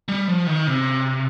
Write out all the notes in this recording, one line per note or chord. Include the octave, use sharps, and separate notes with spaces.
G3
F3
D#3
C3